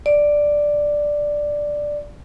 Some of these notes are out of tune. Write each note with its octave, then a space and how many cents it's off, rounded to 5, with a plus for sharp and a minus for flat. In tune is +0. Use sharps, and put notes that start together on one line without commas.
D5 +0